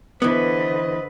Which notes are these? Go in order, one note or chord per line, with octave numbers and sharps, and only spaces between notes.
D3 E3 B3 B4 C5 D#5